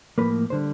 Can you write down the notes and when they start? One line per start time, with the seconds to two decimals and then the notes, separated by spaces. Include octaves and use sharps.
0.18 A2 F3 A#3 B4
0.50 D3 G3 C5